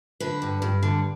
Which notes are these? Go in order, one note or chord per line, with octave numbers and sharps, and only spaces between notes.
D3 B4
G2
G2
D3